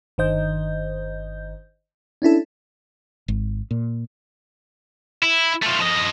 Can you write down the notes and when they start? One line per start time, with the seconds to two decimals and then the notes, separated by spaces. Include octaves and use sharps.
0.18 G1 D#3 C5 D#5 G6
2.22 C#4 D4 E4 A4
3.28 G#1
3.71 A#2
5.23 E4
5.62 A3 F4
5.79 F3 D#5